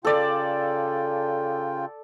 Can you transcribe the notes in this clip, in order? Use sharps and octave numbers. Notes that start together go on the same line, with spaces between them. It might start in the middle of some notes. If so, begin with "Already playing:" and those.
C#3 F4 A4 D5 G5